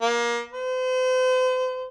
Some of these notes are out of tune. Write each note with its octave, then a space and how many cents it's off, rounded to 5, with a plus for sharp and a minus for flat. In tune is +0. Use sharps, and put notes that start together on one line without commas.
A#3 +25
C5 -40